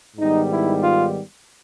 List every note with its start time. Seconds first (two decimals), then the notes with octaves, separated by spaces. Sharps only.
0.17 G#2 D#3 G3 B3 D#4
0.49 E4
0.82 F4